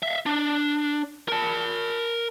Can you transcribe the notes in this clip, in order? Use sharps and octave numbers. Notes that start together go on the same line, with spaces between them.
E5 F5
D4
A#4 A5